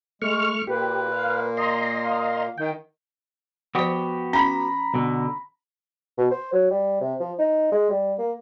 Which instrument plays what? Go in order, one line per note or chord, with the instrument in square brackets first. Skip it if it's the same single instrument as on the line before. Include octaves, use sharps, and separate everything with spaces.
[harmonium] G#3 [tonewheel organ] A3 C#6 F6
[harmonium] A#2 A#3 [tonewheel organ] G4 [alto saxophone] B4
[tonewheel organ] F5
D#5 A#5 C6
[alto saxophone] F5
[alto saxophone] D#3 [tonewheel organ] G5
[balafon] F3 C5 [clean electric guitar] B3 F#4 G4
[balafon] C#4 [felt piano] A#5 B5
[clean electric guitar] B2 D3
[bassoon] B2
C5
F#3
G3
C3
F3
D#4
G#3
G3
A#3